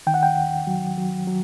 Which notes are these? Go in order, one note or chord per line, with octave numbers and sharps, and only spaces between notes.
D#3 G5
F#5
G5
D#2
F#3
F#3
F#3